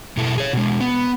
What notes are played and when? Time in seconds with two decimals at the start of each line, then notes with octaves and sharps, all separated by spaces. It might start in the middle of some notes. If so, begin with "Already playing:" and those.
0.17 B2 E4 A4
0.38 G#4 C#5
0.53 B2 G#3
0.81 B3